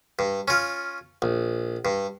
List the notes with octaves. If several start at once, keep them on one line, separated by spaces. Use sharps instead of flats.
G2
C#4 F4
A#1
G2